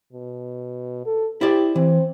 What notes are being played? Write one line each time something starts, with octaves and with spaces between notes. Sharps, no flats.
B2
A4
E4 G4 C5 D5
E3 C4